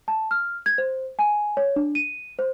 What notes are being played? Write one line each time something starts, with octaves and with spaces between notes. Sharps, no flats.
A5
F6
G#6
C5
G#5
C#5
D4
D#7
C5